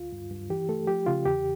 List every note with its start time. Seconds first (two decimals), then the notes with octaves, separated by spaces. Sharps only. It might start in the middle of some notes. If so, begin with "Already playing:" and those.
Already playing: D2 F4
0.12 G2
0.31 G2
0.50 E3 G4
0.69 A3 A4
0.87 F3 G4
1.06 C#3 F4
1.25 E2 G4